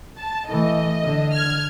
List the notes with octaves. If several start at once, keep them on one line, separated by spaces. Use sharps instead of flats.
A5
E3 A3 D#5
D3
F6 G#6